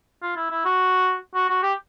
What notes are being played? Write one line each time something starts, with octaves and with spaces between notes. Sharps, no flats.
F4
E4
E4
F#4
F#4
F#4
G4